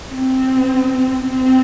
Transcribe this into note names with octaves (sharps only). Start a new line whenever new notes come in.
C4
C4